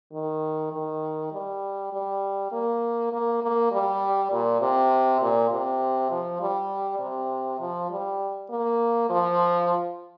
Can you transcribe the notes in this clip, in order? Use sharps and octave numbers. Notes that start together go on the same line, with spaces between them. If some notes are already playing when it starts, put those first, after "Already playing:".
D#3
D#3
G3
G3
A#3
A#3
A#3
G3
A#2
C3
A#2
C3
F3
G3
C3
F3
G3
A#3
F3